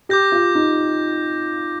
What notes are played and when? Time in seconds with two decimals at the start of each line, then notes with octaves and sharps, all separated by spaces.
0.09 G4 D6 G6 A#6
0.32 F4
0.55 D#4